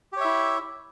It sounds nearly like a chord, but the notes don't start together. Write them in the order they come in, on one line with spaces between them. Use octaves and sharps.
G4 C#5 E5 E4